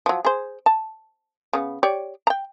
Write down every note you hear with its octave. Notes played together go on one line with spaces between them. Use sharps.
F3 F#3
G#4 C5
A5
C#3 B3
G4 C#5 D5
G5 A#5